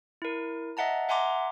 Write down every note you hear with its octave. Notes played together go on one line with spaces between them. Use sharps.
E4 A#4
D#5 E5 F#5 A5 A#5
E5 F#5 G#5 A#5 C6 D6